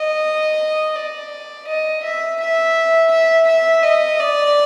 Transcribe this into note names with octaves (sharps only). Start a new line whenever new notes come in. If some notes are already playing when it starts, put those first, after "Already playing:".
Already playing: D#5
D5
D#5
E5
E5
E5
E5
D#5
D5